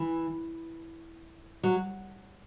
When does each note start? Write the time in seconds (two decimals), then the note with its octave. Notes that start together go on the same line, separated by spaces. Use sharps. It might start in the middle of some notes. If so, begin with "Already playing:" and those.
Already playing: E3
1.63 F#3